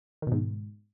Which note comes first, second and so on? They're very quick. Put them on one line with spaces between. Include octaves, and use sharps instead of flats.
D#3 B2 G#2